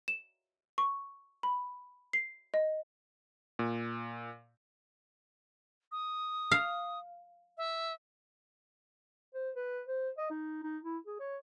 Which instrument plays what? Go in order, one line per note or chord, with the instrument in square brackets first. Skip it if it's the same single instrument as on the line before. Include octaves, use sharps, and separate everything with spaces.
[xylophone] E7
C#6
B5
C7
D#5
[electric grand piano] A#2
[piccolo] D#6
[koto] F5
[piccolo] E5
[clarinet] C5
B4
C5
D#5
D#4
D#4
E4
G#4
C#5